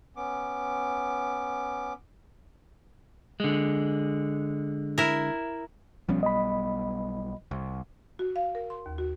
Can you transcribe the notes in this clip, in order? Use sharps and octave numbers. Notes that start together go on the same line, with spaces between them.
B3 C#4 D6
D3 G#3
E4 A#4
B1 F3 G3 B3 C#4
D#5 B5
C2
F#4
F5
A#4
C6
D#2
F#4